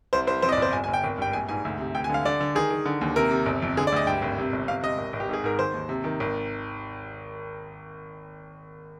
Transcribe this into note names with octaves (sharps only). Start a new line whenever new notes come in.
C2 C5
C2 C5
F2 C5
D#5
D5
G1 C5
G1 G#5
G#5
G1
G5
G#1
G2 G5
A#1 G#5
G#2 G#5
D2
C3
D2 G5
G#5
D3 F5
D3 D5
D3
D#3 G#4
D#3
D3
D#2
C3 A#4
C3
G1
F2
D3 G#4
D5
D2 D#5
G2 G5
G#1
C3
G1
C3 F5
C3 D#5
G#1
G#1
G4
G#2 G#4
G#2 A#4
D#3 C5
D#2
C3
D#3
G#1